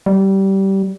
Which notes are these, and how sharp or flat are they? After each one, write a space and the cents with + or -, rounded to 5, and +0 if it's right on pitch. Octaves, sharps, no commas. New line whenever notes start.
G3 -20